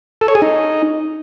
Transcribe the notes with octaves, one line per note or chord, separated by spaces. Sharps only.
A4
C#5
G#4
D#4